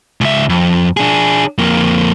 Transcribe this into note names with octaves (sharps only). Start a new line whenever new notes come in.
C#2 E5
F2
D4 G#4
F2 A#3